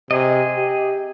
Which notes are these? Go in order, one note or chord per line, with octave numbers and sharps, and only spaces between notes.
C3 G#4 D#5
G4